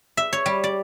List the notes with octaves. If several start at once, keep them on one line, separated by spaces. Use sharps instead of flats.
E5
C#5
G3
D5